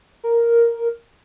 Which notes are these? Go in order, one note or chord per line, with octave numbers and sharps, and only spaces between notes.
A#4